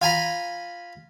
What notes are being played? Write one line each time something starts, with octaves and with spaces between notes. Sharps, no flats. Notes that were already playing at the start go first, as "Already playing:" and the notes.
F4 G#5 A#5 B5